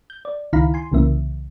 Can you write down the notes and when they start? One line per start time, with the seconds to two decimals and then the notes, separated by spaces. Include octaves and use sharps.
0.10 G6
0.25 D5
0.53 C#2 D#3 E4 F5 A#5 B5
0.74 G#5 C6
0.92 C2 C#3 E3 A#3 E5